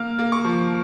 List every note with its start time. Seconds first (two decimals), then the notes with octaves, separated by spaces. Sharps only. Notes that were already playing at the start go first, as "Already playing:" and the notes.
Already playing: A#3 F6
0.19 A#3
0.32 C#6
0.44 F3